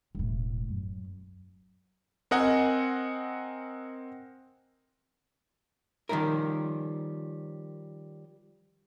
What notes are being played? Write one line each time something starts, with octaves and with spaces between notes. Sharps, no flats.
E1 A2
F#2
C4 A#4 D#5 F#5 G#5
D#3 F3 G3 C#4 A#4